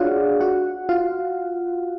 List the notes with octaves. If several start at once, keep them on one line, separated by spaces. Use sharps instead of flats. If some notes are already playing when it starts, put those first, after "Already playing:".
Already playing: D4 F4 F#4 G#4 C#5 D5 F5 F#5
F#4 F#5
F4 F5